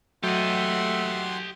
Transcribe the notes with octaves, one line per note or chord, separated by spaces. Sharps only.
F#3 A3 G4 D#5 F#5 C6